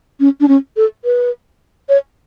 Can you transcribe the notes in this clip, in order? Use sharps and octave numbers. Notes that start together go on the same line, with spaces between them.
C#4
D4
C#4
A4
B4
C#5